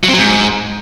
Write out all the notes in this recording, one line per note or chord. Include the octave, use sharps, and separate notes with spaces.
F#3
C4
F#3
G#2